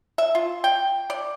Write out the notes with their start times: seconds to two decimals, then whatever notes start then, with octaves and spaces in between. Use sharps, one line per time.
0.18 E5
0.35 F4
0.64 G5
1.10 D5